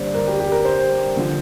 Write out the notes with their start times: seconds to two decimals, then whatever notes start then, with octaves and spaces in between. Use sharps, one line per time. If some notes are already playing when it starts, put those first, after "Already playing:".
Already playing: G2 D3 G3 A#3 C5 D5
0.14 A#4
0.27 G4
0.40 G4
0.52 A#4
0.65 C5
1.17 D3 F3